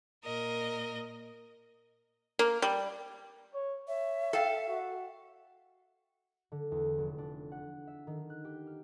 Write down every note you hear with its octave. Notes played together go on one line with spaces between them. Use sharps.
A#2 A#4 D#5
A#3
G3
C#5
C#5 E5
A4 F5 G5
F#4
D3
E2
F1
D4
F#5
E5
D#3
F#6
G4
F6